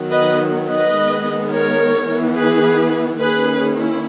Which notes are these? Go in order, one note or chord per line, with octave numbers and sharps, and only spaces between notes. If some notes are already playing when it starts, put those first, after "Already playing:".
Already playing: D#3 F#3 B3
B4 D#5
B4 D#5
D#3 G#3 B3
A#4 C#5
E3 B3
G#4 B4
D#3 A#3 C#4 G#4 B4
E4